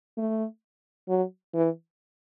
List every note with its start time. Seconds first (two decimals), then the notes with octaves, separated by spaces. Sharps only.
0.18 A3
1.09 F#3
1.54 E3